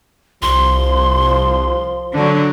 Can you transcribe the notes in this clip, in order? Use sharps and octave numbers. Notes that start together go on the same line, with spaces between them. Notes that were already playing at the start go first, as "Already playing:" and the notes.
C2 F3 C6
D3 F#3 D4